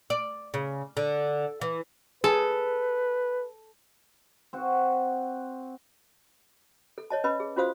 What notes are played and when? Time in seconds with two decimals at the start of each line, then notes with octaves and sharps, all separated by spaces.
0.10 D5
0.54 C#3
0.97 D3
1.61 E3
2.24 G#4 A4 B4
4.53 C4 F#4
6.98 A4
7.10 C#5 D#5 A5
7.24 C#4 B4 D#5 B5
7.40 G#4
7.56 C#4 F4 F#4 C5 F5 D#6